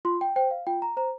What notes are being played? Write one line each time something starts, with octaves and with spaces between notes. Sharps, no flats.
F4 C6
G5
C5 G5
F5
F4 G5
A#5
C5 A#5